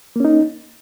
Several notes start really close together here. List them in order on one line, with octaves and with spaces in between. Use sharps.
A#3 C#4 D#4